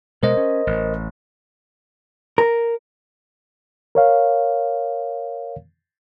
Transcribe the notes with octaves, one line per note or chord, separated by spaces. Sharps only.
B2 G#3 A#4 C5 D#5
C#4
A1
A#4
A#4 C#5 F5